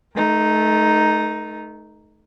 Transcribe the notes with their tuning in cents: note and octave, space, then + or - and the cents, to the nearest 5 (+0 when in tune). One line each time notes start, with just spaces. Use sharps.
A3 -30 D#4 +0 A#4 +35